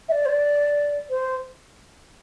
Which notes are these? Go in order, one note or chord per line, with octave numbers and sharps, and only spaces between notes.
E5
D5
C5
D5
C5